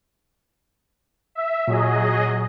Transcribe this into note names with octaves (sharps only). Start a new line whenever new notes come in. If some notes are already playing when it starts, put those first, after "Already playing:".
E5
A#2 F#3 G#4 D#5